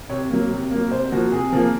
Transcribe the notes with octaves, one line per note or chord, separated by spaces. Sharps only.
C3 C#5
F#3 A#3
C3
F#3 A#3
C3 C5
F3 A#3 F#4
C3 G#4
F3 A#3